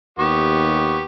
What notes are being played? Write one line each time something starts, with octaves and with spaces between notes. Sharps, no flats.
D#2 B3 G4 C#6